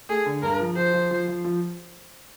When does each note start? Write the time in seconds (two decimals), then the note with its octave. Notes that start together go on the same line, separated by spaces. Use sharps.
0.09 A3 G#4
0.26 D3
0.42 G2 A#4
0.60 F3
0.77 F3 C5
0.94 F3
1.11 F3
1.28 F3
1.45 F3